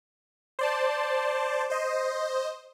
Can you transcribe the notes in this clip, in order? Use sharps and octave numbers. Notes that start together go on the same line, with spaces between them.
C5 D5 A5
C5 D#5